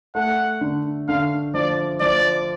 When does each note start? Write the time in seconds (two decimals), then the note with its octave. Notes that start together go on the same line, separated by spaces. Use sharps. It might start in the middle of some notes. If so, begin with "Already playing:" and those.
0.15 A3 F#5
0.61 D3
1.08 D3 F5
1.54 F3 D5
2.00 F3 D5